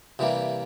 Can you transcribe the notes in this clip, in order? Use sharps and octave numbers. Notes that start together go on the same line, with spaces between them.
C3 E3 G3 A#3